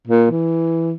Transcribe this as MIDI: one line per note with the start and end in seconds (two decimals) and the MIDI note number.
0.07 0.26 46
0.31 0.92 52